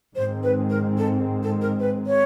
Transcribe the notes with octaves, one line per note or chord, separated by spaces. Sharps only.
G#2 D#3 G#3 C4 C5
B4
A#4
A4
A4
A#4
B4
C#5